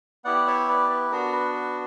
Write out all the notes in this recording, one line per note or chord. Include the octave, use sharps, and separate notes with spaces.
B3 E4 G4 D5 F#5
C#5 E5
B4 D5
B4
B3 D4 F#4 A#4
B4
B4